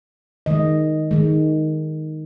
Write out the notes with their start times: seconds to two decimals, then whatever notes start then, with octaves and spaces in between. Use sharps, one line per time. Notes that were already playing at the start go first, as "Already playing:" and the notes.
0.46 D#3 G#3 D#5
1.11 D#3 G#3